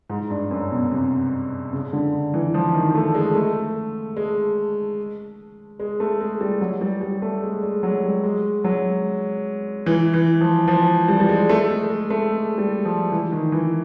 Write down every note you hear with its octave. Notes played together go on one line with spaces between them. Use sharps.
G#2
G2
F#2
B2
C3
C#3
D3
E3
F3
D#3
A3
G#3
A3
G#3
G#3
A3
G#3
G3
F#3
G3
G3
A3
G#3
G#3
F#3
G3
G#3
F#3
E3
E3
F3
F3
G3
G3
G#3
A3
G#3
G#3
A3
G#3
G3
F3
E3
D#3
E3